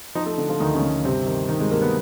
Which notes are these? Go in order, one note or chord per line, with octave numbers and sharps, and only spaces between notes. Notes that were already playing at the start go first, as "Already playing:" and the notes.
F3 D#4 D#5
A3 A4
D3
F3 F4
D2 D#3 D#4
C#3 C#4
D2
G2 C3 C4
D#3
D#3 D#4
G#3 G#4
G2 A#3 A#4
B3 B4